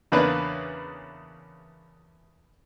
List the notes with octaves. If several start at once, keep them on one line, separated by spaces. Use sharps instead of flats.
E2 C#3 A#3 D4 B4